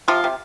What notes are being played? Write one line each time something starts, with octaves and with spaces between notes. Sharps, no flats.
C3 F3 F4
C3